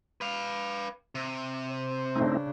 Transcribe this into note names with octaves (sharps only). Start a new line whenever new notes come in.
B4 F5
C3
C5
C#3 A3 C4 D4 D#4